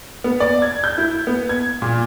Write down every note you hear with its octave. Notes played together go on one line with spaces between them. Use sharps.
B3
D5
G#6
G6
E4
B3
G#6
A#2